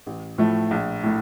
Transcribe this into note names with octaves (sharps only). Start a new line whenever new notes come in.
A1
A2 F3 A3
A#1
A2 A3